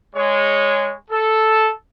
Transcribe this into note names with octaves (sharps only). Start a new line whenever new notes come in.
G#3 C#5
A4